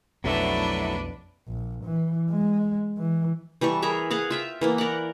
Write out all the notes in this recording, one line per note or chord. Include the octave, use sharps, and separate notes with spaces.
B1 F2 B2 F#3 A3 D4 E4 B4
A#1
E3
G#3
E3
E3 G3 A4 C#6
G#4 A#4 C#5 E5
G#4 F5 F#5
F4 E5 G5
E3 A#3 B3
A#4 D5 F#5